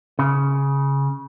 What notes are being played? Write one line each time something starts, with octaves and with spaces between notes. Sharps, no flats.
C#3